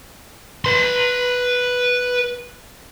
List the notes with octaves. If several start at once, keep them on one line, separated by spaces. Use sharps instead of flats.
B4 C6